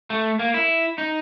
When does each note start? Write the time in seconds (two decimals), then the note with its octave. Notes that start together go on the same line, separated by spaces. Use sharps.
0.10 A3
0.39 A#3
0.54 E4
0.98 D#4